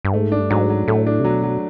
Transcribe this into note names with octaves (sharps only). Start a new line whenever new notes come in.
G2
G#2 A3
D4
G2
G#2 F#3
F#3
A2 A3
D4
C3
B2 F#3
F#3